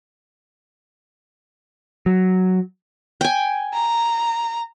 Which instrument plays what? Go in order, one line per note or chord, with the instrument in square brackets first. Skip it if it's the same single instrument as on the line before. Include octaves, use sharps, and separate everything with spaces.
[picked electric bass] F#3
[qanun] G5 G#5
[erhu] A#5